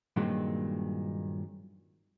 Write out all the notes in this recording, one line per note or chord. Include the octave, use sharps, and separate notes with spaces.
G2 A#2 D#3 F#3 G#3 C4